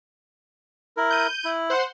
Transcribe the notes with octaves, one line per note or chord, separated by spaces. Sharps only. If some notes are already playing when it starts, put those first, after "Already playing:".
E4 A#4
G6 D#7
E4
C5 F#5 C6